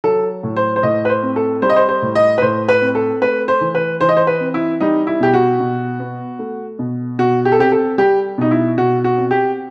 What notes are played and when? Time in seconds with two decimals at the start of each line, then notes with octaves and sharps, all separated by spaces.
0.04 F#3 A4
0.43 A2
0.56 C5
0.76 C5
0.83 A2 D#5
1.05 B4
1.09 C5
1.23 C4
1.36 A4
1.62 G3 C5
1.69 D#5
1.76 C5
1.89 C5
2.02 A2
2.15 D#5
2.38 B4
2.42 A2 C5
2.68 B4
2.81 C4
2.95 A4
3.21 A3 B4
3.48 C5
3.61 E3
3.75 B4
4.01 E3 C5
4.09 D#5
4.17 C5
4.27 B4
4.40 C4
4.54 E4
4.80 G3 D#4
5.07 E4
5.20 B2 G4
5.34 F#4
5.60 B2
5.99 B3
6.39 A3
6.79 B2
7.19 B2 F#4
7.45 G4
7.52 A4
7.59 C4 G4
7.72 A4
7.98 G3 G4
8.38 B2 D#4
8.51 E4
8.78 B2 F#4
9.04 F#4
9.18 C4
9.31 G4